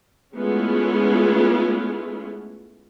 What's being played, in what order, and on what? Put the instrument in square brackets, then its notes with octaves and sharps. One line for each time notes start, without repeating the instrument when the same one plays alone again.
[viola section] G#3 A3 B3 C#4 E4 F4